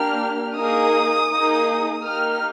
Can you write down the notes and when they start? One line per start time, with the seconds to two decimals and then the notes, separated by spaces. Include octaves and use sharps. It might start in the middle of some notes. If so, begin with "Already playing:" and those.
Already playing: A#3 D4 G4 F6
0.57 A#3 D#4 G#4 D#6
1.31 A#3 D#4 G#4
2.03 A#3 D#4 G4 F6